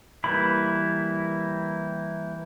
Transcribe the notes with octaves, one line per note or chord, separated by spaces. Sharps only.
E3 G3 A#3 E4 B5